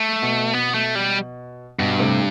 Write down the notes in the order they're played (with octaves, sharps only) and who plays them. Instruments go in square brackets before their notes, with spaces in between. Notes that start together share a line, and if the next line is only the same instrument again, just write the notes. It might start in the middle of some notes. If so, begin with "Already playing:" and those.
Already playing: [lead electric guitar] A3
[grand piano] B2
[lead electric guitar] B3
A3
G3
[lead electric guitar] G2 [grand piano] B2
[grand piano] A2 C3